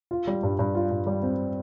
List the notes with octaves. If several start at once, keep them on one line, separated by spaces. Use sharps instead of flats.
F4
G3
G2
G2
F4
G2
G3
C4